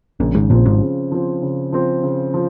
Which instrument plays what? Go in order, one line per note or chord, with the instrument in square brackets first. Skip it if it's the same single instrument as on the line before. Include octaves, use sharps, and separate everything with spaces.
[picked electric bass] A#1 A#2 [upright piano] C#3
[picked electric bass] G#1 G#2
[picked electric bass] A#1 A#2 [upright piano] F3 C4
[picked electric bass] G#1 G#2
[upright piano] C#3
F3 C4
C#3
F3 C4
C#3
F3